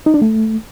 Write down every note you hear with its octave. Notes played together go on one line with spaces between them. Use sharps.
D#4
D4
A3